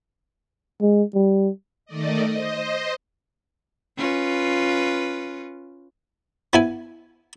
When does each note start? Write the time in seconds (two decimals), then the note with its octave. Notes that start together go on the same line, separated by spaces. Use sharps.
0.82 G#3
1.15 G3
1.86 D#3 A3 D5 D#5
2.27 C5 D#5
3.97 C#4 F4 B4
6.53 B3 E4 G#5